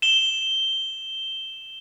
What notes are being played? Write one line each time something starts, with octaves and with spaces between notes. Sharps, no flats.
E7 G7